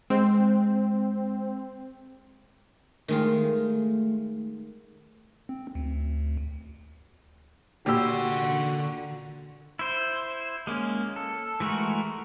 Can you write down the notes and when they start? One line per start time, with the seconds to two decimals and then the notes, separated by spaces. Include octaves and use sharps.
0.10 G#3 C4 C5
3.08 D#3 G#3 A3 F4
5.49 C4
5.75 D2
7.86 A#2 D3 F#4 G4 C6 E6
9.79 E4 C5
10.67 G#3 A#3 C#4
11.16 A4
11.60 E3 G#3 A3 F#4 A#4